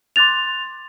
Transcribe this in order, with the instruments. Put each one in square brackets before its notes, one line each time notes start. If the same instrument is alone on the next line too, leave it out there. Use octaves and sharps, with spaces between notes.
[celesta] C6 D6 F#6 A6 F7